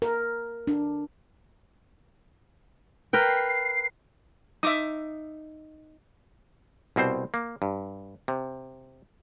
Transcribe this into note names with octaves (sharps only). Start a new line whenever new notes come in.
A#4
D4
A#4 B4 G5 C7
D#4 E5 D6 D#6
C2 B2 C4 C5
A#3
G2
C3